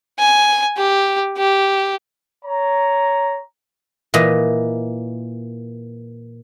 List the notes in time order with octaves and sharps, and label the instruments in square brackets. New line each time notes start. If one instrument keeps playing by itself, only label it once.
[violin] G#5
G4
G4
[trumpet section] C#5 A#5
[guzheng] A#2 E3 D#5